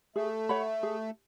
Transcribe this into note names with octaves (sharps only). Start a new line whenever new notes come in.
A3 G#4
C#5 F#5 B5
G#4